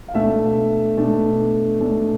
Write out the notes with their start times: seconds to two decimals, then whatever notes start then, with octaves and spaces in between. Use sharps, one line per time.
0.08 F5
0.14 B2 A3 D4 E5
0.97 B2 A3 D4
1.81 B2 A3 D4